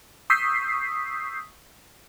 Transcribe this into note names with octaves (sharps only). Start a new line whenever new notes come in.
C#6 D#6 E6 G6 B6 C7